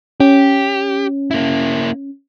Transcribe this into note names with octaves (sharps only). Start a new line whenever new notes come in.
C#4 G4
A#3 E4